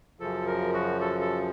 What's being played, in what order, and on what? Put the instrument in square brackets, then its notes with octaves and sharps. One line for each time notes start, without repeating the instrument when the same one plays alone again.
[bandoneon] F#2 C#3 F3 A4
A#4
F#4
A4
A4